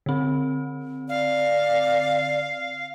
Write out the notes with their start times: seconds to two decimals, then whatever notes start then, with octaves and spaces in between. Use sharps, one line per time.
0.06 D3 C4
1.09 D5 F5